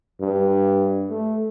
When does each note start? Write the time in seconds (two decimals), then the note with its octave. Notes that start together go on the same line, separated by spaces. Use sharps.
0.21 G2
1.09 A3